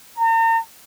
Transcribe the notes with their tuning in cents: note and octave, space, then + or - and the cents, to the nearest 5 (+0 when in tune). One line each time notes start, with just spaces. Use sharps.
A#5 -40